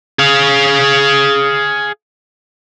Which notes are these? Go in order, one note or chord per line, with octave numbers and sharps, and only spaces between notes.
G#4 F5